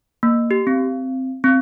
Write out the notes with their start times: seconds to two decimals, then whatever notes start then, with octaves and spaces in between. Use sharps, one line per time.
0.23 A#3
0.51 G4
0.67 C4
1.44 C4